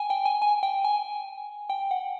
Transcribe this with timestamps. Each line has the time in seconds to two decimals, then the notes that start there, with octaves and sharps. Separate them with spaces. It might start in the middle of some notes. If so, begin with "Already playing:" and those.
Already playing: G5 G#5
0.10 G5
0.25 G#5
0.42 G#5
0.63 G5
0.84 G#5
1.70 G5
1.91 F#5